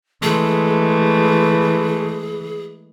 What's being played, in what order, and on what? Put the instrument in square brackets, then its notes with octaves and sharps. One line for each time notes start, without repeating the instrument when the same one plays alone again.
[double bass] E3 [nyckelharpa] G#3 A3 [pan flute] G#4